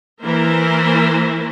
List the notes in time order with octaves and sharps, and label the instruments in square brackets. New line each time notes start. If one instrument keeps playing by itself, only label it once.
[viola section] E3 A#3 E4 A#4 C5